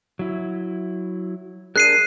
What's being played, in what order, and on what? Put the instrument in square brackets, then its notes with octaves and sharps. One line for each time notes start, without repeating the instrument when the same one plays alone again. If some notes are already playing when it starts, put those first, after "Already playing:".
[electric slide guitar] F#3 E4
[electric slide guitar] D4 G#4 A#4 [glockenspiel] F#6 C7 D#7